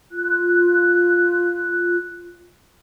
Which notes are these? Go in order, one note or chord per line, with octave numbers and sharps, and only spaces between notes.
F4 F#6